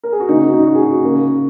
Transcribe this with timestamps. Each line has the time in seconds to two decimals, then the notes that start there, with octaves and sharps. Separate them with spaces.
0.04 A#4
0.12 G#4
0.20 F#4
0.29 C#3 A#3 D#4
0.41 F#4
0.53 D#4
0.66 F#4
0.75 G#4
0.82 F#4
1.03 C#3 A#3